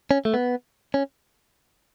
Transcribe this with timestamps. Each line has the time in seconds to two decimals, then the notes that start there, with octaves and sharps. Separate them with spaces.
0.11 C#4
0.25 A3
0.34 B3
0.94 C#4